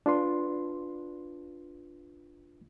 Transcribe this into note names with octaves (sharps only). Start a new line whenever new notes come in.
D4 F4 B4 C6